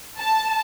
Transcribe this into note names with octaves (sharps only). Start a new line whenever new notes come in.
A5